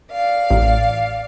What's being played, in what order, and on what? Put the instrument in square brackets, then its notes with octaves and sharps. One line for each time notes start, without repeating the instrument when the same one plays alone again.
[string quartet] D5 F5
[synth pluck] A1